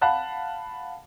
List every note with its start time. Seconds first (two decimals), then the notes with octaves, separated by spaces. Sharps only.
0.01 F5 F#5 A5 B5 F#6